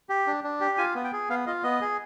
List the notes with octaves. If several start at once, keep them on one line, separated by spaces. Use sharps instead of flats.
G4
D4
D4
G4
F4 G#5
B3
G5
G#4
B3 F5
F4 D#5
B3 D#5
G#4